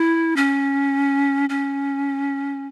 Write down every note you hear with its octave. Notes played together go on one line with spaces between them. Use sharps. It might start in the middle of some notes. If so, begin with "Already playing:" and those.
Already playing: E4
C#4
C#4